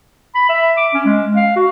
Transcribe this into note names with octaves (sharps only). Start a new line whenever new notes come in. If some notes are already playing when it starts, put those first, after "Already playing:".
B5
E5
D6
C#4
G#3
F5
F#4